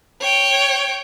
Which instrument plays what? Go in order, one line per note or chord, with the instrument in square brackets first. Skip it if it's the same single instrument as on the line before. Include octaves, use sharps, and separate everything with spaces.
[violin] C#5 G5